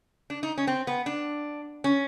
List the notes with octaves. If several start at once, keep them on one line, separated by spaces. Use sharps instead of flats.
D4
D#4
C#4
C4
B3
D4
C#4